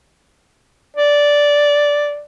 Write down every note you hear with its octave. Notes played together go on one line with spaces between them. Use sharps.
D5